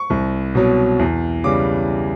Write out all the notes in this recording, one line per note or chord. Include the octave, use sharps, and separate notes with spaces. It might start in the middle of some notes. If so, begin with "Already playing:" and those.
Already playing: C#6
C2
B2 F#3
E2
C#3 E3 G3 D6